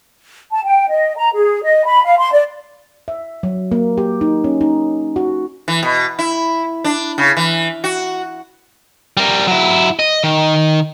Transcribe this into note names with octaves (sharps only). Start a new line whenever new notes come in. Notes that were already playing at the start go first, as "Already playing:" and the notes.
A5
G5
D#5
A#5
G#4
D#5
B5
F5
C6
D5
E5
F#3
A#3
G4
D#4
C#4
D#4
F#4
E3
B2
E4
D4
C#3
E3
F#4
G3 A#4
F#3 E4
D#5
D#3